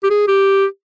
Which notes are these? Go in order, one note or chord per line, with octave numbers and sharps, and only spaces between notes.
G4
G#4
G4